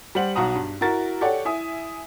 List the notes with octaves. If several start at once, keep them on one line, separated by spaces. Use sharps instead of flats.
G3 C5 F#5 F#7
B1 F#4 A#5 D#6
G2
E4 F#4 A#4 A6
G4 A4 C#5 D5 F#5
E4 E5 G#5 D#6